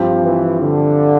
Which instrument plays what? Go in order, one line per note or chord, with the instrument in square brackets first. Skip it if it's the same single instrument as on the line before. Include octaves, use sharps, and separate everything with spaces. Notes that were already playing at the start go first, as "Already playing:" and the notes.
Already playing: [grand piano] G2 F3 C4 G4
[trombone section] E3
D3